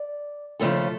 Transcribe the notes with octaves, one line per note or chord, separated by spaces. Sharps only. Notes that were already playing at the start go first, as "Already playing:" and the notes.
Already playing: D5
D#2 C#3 F3 A3 A4